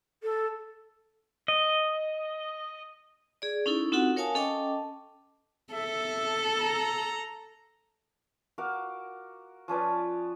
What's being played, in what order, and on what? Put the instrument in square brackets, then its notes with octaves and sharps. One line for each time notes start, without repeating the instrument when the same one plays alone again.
[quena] A4
[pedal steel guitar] D#5
[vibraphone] G#4 D5
C#4 D#4 E4 A4
C4 D#4 F4 F#4 A4 F#5
A#4 C#5 F5 G#5 A5 D#6
C#4 A4 D#5 G5 A5 D6
[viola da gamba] A4 [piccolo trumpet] E5
[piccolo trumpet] A#5
[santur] F#4 A#4 F5 D6
F3 C#4 B4 D5